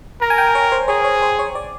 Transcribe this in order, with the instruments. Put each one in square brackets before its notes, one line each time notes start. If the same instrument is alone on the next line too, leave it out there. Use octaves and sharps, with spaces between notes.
[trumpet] A#4 [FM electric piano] A#5
[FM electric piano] G#5
G5
C#5
C5
[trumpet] G#4 [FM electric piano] C#5
[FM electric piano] C#5
C5
C#5
D5